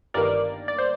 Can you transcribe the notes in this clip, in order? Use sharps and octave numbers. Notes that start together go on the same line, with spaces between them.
G1 G2 D#3 A#3 A#4 D5
D5
C5